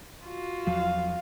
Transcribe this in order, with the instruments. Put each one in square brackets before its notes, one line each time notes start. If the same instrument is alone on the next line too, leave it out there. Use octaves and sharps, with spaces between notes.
[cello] F4 F#4
[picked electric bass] E2 F3 F#3 [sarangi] F5